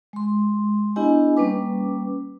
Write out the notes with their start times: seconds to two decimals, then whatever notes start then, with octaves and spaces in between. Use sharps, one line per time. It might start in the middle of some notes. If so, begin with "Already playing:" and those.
0.13 G#3 C6
0.96 B3 D4 E4 G4 D#5 G#5
1.37 G3 A#3 C#4 B4 D6